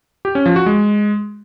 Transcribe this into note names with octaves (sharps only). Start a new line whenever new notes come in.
G4
C#4
F3
F#4
G#3